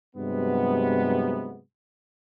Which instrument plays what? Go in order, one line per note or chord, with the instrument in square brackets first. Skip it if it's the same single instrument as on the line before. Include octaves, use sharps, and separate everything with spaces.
[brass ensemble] G2 C3 F#3 G#3 B3